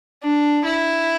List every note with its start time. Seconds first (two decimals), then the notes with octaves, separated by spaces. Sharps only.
0.23 D4
0.65 E4